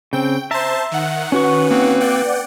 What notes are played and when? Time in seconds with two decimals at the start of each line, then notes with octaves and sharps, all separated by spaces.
0.13 C#3 C4 G5
0.51 C5 E5 A5 A#5
0.91 D#3 F#5
1.32 C#4 F#4 B4 C#6
1.71 A#3 C4
2.00 D5 F#5 G5